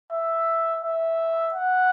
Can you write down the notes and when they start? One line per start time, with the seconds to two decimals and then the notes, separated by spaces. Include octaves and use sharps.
0.12 E5
0.83 E5
1.54 F#5